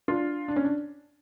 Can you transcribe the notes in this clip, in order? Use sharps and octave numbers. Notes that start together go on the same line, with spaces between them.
D4 F4
D4
C#4
D4